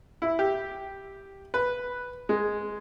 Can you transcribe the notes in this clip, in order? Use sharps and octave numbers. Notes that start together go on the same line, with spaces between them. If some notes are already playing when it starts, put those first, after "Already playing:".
E4
G4
B4
G#3